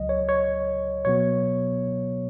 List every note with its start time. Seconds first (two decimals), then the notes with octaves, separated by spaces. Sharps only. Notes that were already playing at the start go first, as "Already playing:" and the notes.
Already playing: C#2 C#3 F#3 D#5
0.09 C#5
0.29 C#5
1.05 B2 F#3 B3 C#5